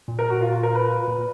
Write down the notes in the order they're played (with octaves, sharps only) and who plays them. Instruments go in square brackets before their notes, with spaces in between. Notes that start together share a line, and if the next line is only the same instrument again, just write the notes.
[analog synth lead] A#2
[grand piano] A#4
F#4
F4
F4
A#4
B4
[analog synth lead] A#2
A#2